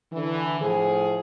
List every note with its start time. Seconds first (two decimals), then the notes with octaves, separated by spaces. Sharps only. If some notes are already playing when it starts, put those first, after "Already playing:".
0.12 D3 E3
0.60 A2 F3 G#4